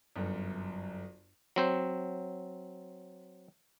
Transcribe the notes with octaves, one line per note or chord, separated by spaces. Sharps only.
G1 F#2
F#3 C4 C5